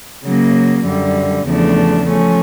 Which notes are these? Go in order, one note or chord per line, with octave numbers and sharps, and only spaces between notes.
C#3 F#3 A#3
F#2 D3 G3
E2 C#3 F3 A3 D4
F3 A3 C#4